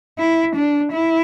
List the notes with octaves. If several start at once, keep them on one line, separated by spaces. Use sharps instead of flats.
E4
D4
E4